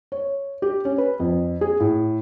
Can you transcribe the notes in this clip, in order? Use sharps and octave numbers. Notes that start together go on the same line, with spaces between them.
C#5
G4
C#4
B4
F2
G#4
A2